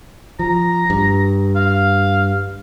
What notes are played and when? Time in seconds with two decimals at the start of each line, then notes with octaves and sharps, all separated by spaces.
0.39 F3 A#5
0.90 G2
1.56 F5